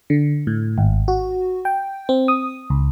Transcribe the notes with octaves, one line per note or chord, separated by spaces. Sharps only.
D3
A2
G#1
F#4
G5
C4
D#6
C#2